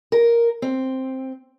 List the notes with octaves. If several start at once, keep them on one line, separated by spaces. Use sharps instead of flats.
A#4
C4